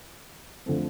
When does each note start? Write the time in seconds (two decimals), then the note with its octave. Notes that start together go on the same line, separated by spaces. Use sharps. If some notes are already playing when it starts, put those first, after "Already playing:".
0.66 D3 F3 A3 C4